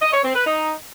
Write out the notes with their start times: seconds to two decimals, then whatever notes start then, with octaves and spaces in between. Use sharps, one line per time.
0.01 D#5
0.12 C#5
0.23 C4
0.35 B4
0.46 D#4